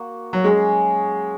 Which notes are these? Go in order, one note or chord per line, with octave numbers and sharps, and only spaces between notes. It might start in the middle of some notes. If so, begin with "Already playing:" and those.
Already playing: A#3 F#4
F#3
G#3 C#4 G#4 C#5